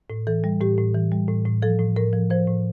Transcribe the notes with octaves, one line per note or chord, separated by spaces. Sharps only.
A2
E3 A4
G3
A2 G4
A2
E3
G3
A2
A2
F3 A4
A2
A2 A#4
F3
F3 C5
A2